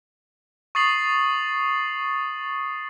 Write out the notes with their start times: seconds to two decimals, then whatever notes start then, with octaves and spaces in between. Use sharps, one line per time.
0.75 C#6 D#6 A6 C7 F#7